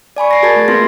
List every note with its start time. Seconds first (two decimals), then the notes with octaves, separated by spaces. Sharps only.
0.16 D5 G#5 B5 C#6
0.31 A#6 C7 D7
0.43 F#4 G#4 A#4 A5 G#6 A6
0.56 A3
0.68 A#3 B3 F4 B4 C6 A#6